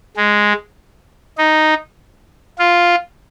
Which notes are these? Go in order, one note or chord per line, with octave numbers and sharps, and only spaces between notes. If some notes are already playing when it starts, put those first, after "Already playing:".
G#3
D#4
F4